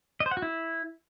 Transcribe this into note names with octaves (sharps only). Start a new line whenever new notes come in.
D#5
C5
F#5
F#4
E4